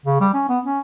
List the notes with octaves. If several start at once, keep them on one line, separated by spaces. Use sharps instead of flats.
C#3
G3
C#4
B3
C#4